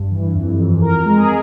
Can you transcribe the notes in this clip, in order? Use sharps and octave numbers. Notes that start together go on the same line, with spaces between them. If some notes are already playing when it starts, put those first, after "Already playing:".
Already playing: G2
E3
F2
F2
F2 A#4
G#3
G#4